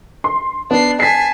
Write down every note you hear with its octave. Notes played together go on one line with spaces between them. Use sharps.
C6
B3 D4 C7
G#5 A5 B6 C7